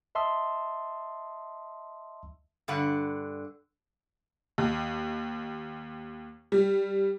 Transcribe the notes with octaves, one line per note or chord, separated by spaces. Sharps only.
D#5 E5 A5 C6 D#6 E6
G2 D3 F#5
D#2
G3